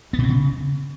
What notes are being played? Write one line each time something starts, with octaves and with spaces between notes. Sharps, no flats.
B3
B2
C4
C#3